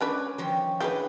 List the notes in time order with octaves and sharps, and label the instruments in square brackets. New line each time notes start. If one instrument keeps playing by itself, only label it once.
[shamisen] G#3 D4 B4 [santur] C#4 D6 D#6
[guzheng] D#3 F3 G3 [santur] C#5
[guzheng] B3 D4 E4 [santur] G#4 B4 [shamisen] F5 G5